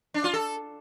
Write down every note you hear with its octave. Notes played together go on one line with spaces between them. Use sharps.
D4
F4
A4